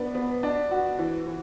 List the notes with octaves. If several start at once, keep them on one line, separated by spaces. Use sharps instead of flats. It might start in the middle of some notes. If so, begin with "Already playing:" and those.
Already playing: B3 D4
B3
D4
F#4
E3
E3